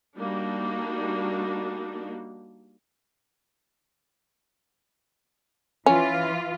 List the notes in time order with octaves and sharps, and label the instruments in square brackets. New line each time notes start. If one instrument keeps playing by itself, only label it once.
[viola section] G3 A#3 D4 D#4 F#4
[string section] E3 F4 [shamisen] C#4